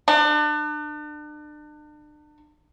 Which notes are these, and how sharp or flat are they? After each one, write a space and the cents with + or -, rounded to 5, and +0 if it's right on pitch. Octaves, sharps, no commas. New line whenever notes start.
D4 +35